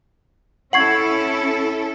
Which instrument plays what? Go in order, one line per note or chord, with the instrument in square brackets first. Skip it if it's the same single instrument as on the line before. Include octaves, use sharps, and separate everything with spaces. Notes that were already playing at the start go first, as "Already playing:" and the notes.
[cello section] C#4 E4 A4 [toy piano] F#5 C#6 [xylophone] G#6 C7 F#7